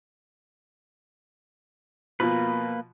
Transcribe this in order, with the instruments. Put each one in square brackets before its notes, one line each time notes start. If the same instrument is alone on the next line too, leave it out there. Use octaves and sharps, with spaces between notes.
[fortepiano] B2 F3 [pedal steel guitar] A#3 B4